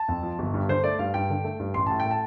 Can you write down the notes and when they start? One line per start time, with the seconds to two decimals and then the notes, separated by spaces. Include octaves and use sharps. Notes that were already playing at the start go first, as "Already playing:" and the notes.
Already playing: A5
0.08 F2
0.23 F3
0.39 G1
0.54 G2
0.68 D3 C5
0.83 A3 D5
0.99 G2 F5
1.14 G2 G5
1.30 D3
1.44 A3
1.59 G2
1.74 A1 C6
1.86 A2 A5
2.00 G5
2.05 A3
2.11 A5